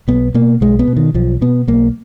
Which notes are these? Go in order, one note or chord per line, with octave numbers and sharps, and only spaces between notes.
B1 B3
B2 A#3
B1 G#3
B3
B2
D#3
B1 F3
B2 B3
B1 A#3